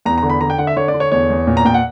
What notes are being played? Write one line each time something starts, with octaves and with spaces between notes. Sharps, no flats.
E2 A#5
A#5
D3
B5
D3 A#5
G5
D3 F#5
E5
D3 C#5
D5
D3
C#5
E2 C#5
E2
A#2
A#5
A#2 G5
F#5